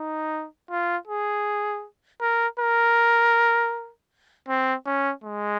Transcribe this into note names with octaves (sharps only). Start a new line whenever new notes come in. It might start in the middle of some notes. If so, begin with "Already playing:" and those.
Already playing: D#4
F4
G#4
A#4
A#4
C4
C#4
G#3